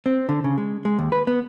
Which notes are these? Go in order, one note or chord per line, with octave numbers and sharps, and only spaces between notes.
C4
D3
C#3
G#3
G#3
D#2
B4
B3